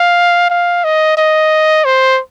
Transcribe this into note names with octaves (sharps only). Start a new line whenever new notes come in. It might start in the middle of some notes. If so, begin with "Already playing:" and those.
Already playing: F5
F5
D#5
D#5
C5